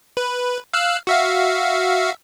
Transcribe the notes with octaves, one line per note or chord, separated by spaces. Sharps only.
B4
F5 E6 F#6
F#4 E5 F5